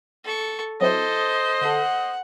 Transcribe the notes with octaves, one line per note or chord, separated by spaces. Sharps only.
A4 C#6
F#3 C4 E4 A4 C5 D#5 D#6
D3 A4 F#5